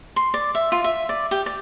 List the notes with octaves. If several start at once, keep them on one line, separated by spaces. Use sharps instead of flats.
C6
D5
E5
F4
E5
D5
G4
D5